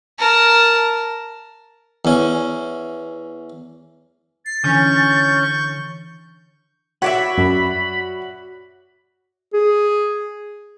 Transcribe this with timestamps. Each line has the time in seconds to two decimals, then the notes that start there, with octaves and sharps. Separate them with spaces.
0.19 A#4 A5
2.05 E2 C#4
4.46 A6 C7
4.64 D3 E3 C#4 C#6 G6
7.02 F#4 C#5 D5 E5 B5
7.38 F#2
9.54 G#4